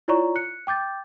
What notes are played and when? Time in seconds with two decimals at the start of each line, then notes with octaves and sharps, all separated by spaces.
0.08 E4 F4 C#5 D5 A#5 C#6
0.36 F#6 C#7
0.67 G5 D6 G6 A6